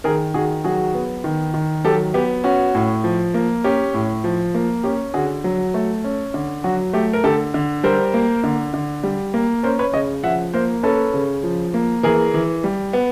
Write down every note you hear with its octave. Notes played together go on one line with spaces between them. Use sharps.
D#3 G#4 A#4
D#3 F#4 G#4
F#3 F#4 G#4
B3
D#3
D#3
F#3 G4 A4
B3 G4
C#4 F#4
A2
F3
A#3
C#4 G4
A2
F3
A#3
C#4 G4
D3 F#4 G#4
F#3
A3
C#4
D3
F#3 F#4
A3 G4
A#4
D3 G4 A4
D3
G3 A#4 C5
A#3
D3
D3
G3
A#3
C#4 A#4 C5
B4 C#5
C#3 C#5 D#5
F3 E5 F#5
A#3 A#4 C5
C#4 A4 B4
C#3
F3
A#3
E3 G#4 A#4
E3
G3
B3